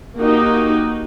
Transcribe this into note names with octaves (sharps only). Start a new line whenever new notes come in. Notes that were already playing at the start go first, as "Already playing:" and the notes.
A#3 D#4 F#4 G4